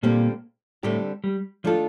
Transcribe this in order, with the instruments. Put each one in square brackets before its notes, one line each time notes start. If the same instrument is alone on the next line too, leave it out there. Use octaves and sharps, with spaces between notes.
[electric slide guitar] A#2 A#3 [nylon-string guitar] D3 G3 C4 G4
[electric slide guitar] A2 A3 [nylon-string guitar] D3 G3 C4 G4
[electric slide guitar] G3
[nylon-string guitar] D#3 A3 D4 F4 A4 [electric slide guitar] F3